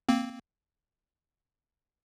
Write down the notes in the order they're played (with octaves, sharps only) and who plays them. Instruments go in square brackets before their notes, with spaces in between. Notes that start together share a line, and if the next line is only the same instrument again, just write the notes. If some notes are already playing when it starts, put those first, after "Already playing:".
[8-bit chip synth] A#3 C4